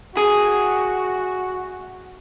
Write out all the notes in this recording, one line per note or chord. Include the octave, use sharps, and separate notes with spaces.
E4 F#4 G#4